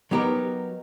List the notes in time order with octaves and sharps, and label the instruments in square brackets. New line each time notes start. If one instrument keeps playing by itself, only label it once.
[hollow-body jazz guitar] F#3 B3 D#4 G4 A#4